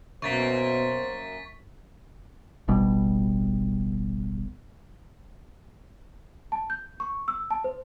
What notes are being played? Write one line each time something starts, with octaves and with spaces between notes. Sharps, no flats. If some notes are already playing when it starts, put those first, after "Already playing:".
F#2 B2 A#3 C5 C#6 A6 B6
D1 G#1 B2 G3
A5
G6
C#6
E6
A5
C5